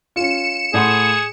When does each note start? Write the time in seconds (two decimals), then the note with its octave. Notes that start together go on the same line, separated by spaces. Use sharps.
0.16 C#4 F4 C#7 E7
0.74 A2 G#4 F#5 C6